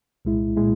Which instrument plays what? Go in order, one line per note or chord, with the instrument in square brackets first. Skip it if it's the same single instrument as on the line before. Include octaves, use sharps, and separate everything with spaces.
[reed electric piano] C2 A#2 G#3 E4
A#2 G#3 E4